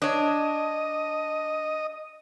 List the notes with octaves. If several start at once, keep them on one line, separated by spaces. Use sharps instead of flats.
D4 C#5 D#5